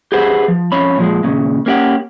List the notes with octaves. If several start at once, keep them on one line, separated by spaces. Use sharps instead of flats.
G4 G#4 B4 C5 F#5
F3
F2 C#4 C#5 B5
A#2 F3 G#3
D#2 A#2 C#3
A#3 C#4 G4 D5 F#5